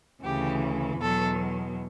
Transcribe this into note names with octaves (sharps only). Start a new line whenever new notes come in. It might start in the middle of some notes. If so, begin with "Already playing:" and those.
D2 C#3 E3 G4
E2 B2 F#3 A4